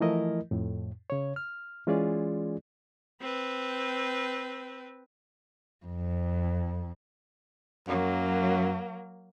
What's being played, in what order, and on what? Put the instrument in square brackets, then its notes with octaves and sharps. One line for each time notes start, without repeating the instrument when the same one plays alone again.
[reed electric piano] E3 F3 A3 E4 A#4 D#5
F2 A2
C#3 C#5
F6
E3 G#3 C#4 F4 G#4 D5
[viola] C4 B4
[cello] F2
[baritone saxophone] F#2 [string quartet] F#3 A#3